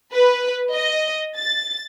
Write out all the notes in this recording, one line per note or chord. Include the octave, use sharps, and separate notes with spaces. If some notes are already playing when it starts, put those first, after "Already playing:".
B4
D#5
A6